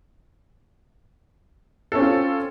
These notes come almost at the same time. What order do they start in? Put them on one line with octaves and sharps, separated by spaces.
A4 C#4 C4 F4